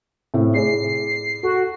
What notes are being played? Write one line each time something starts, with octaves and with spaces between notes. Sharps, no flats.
A2 C3 E4
E4 G#4 D5 C7
F#4 A4